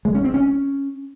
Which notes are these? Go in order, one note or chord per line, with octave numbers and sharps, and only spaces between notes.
G#3
C#4
C4
C#4